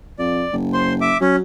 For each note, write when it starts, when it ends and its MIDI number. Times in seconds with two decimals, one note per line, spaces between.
0.19 0.45 41
0.19 0.55 74
0.53 1.14 30
0.73 0.93 72
0.73 0.93 84
1.01 1.17 76
1.01 1.17 86
1.21 1.41 54
1.21 1.36 61